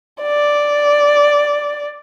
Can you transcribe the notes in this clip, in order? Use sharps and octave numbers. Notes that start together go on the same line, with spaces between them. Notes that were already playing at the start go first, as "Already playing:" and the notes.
D5